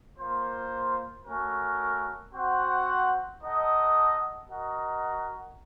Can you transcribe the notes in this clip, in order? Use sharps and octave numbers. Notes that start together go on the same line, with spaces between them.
A#3 F4 C5
A3 C#4 F#4 A#4
C4 F#4 C5 F#5
D#4 A4 D#5 F#5
F#4 A#4 D#5 F#5